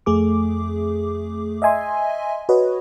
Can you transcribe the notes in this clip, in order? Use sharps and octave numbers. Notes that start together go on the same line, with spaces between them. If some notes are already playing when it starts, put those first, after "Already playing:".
F2 A3 G#4 D6
D#5 E5 G#5 C6
F#4 B4 C#5 D#5